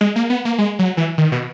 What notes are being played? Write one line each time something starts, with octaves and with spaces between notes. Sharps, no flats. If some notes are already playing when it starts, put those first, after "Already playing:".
G#3
A#3
B3
A#3
G#3
F#3
E3
D#3
B2